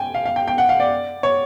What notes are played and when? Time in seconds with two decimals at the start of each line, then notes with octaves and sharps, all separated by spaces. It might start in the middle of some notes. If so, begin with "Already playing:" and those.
Already playing: G5 G#5
0.14 F5
0.25 F5
0.36 G5
0.48 G5
0.58 F#5
0.69 F5
0.80 D5
1.23 C#5